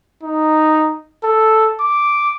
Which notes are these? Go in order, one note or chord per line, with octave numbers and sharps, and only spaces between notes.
D#4
A4
D6